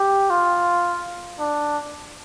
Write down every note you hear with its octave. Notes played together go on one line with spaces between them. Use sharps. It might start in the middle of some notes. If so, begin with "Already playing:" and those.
Already playing: G4
F4
D4